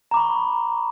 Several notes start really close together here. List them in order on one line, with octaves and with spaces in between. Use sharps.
A#5 D6 B5 C#6